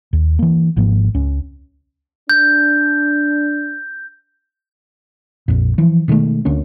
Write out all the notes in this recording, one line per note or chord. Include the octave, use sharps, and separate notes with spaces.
D#2
E3 A#3
G#1 G#2 F3 A#3
C#2 C#4
D4 G6
A#1 F2 A#2
E3 F3
B2 D#3 G#3 A3
D2 D3 A#3 C#4